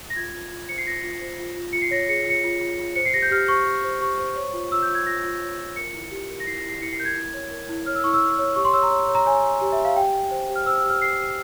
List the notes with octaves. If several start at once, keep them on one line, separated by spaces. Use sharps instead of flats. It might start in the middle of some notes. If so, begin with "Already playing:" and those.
A#6
F4 G#6
F4
F4
C5 C#7
C7
F4 A#6
F4
C5
F4
F4
F4 C#7
C7
C#5 A#6
G#4 C#7
F4 C#7
F4
F4
F4
C5 C#7
C7
G4 A#6
G6
G4 F6
C5 C#6
G4
C5
G4 C#6
C5
C#5
F4
F4 E6
G6
F4
G#6
F4 A#6
F4
C#5
F4
A#4 C#7
E4
G4
A#4
A#6
E4 C7
A#6
E4
C7
E4 C#7
C7
A#4 G6
G#6
E4
C#5
A#4
E4
C#5 F6
E6
E4 C#6
E6
E4
C#5
G4 C#6
C6
C#5 E6
A#5
C#5
C#5
A#5
C#5 G#5
C#5
G4
E5
G4
F5
G4 G5
G4
C5
G4
F6
C5 E6
E6
G4
F6
G4 C7
G4